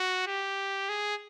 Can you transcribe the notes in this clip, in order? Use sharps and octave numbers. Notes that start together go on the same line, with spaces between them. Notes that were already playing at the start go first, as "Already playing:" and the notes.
Already playing: F#4
G4
G#4